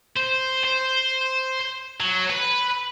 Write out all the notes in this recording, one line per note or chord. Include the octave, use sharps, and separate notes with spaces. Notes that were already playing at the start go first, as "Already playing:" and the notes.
C5
C5
F#3
B4